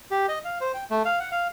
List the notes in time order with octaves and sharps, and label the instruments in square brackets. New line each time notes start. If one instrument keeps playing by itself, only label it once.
[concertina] G4
D#5
F5
C5
G5
A3
F5
F#5
F5